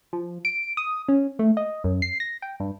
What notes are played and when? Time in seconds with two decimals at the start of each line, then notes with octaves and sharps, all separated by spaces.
0.13 F3
0.45 D7
0.77 D#6
1.08 C#4
1.39 A3
1.57 D#5
1.84 F#2
2.02 C7
2.20 A#6
2.42 G5
2.60 G2